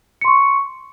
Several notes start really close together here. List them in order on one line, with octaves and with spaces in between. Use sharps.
C#7 C6 C#6